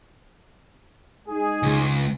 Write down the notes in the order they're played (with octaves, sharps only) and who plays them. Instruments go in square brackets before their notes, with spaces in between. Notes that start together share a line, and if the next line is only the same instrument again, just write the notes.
[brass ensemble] G#3 D#4 G#4
[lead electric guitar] C#2